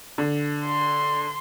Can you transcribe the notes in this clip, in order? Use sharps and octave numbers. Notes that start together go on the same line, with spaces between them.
D3
C6